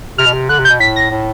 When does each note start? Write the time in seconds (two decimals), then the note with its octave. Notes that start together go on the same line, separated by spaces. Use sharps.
0.18 C3 F6
0.26 B2
0.33 C3
0.49 D3 F#6
0.59 C3
0.65 G6
0.70 B2
0.80 A2 B6
0.96 A#6
1.11 A2